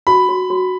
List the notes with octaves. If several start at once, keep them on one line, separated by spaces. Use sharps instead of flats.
F#4 B5
F#4
F#4